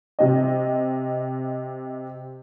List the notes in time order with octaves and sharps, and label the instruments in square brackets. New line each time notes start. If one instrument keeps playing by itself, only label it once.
[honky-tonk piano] C3 D#5